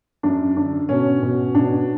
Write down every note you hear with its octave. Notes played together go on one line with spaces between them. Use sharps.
F#2 D4
D3 D4
B2 C#4
B2
B2 D4